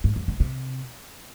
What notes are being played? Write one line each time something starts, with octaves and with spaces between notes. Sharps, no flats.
G#2
F2
D3
C3